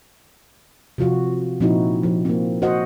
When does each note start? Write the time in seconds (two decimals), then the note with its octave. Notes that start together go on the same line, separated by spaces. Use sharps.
0.98 C3 F3 F4 F#4
1.60 A#2 F3 C4 D#4 E4 F#4
2.03 F3
2.25 A#3 C4
2.62 F#4 C5 D#5 F#5